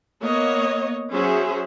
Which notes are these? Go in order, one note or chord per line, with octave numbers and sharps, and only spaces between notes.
A#3 B3 C#5 D#5
F#3 C#4 G#4 C5 E5